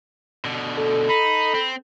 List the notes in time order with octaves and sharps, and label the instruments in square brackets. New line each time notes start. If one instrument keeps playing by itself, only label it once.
[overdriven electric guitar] B2 D3
[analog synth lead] A4
[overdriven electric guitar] D#4 [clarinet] B5
[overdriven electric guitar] C4